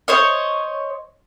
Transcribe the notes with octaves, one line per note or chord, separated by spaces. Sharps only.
C5 C#5 D#5